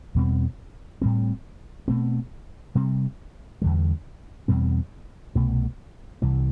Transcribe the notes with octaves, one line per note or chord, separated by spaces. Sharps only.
E2 B2 G3 C4
A2 G3 C4
B2 A3 C4
C3 G3 C4
E2 D3 G3
E2 B2 G3 C4
C2 B2 A3
C2 C3 E3 G3